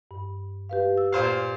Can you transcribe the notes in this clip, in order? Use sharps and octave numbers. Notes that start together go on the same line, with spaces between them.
G2
G4 B4 F5
E6
A#2 C5 F5